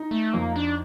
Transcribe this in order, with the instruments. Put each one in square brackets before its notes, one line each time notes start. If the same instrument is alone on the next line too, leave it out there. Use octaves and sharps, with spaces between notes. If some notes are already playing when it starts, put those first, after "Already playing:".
Already playing: [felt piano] D#4
[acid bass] A3
[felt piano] F2 [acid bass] A#3
[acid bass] D4